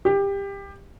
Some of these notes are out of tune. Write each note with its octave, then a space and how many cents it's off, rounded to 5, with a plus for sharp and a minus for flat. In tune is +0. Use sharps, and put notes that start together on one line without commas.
G4 +20